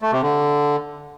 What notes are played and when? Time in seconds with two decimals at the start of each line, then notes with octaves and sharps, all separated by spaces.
0.02 A3
0.12 C3
0.22 D3